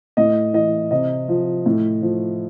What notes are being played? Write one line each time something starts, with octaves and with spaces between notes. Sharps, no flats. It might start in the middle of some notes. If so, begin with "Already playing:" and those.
A2 D#5
E3 D#5
C3 D#5
F3
A2
F3